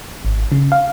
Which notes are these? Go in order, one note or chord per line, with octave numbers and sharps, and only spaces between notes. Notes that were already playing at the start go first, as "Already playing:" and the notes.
G#1
C#3
F5